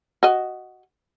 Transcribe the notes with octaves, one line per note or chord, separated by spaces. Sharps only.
F#4 D#5